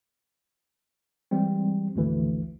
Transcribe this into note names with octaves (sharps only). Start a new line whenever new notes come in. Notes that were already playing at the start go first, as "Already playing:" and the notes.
E3 G3 G#3 C4
G#1 D2 E3